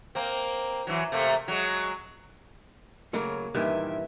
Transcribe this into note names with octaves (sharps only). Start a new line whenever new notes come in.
A#3 C4
E3 F#3
C3 A3 A#3
F#3 G#3
C#3 F#3 A3 A#3 C#5
G2 A#2 D#3 E3 E5